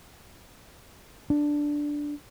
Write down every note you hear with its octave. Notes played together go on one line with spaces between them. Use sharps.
D4